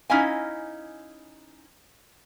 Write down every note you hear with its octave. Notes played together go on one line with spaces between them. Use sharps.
C#4 D#4 E4 D#5 F5 G#5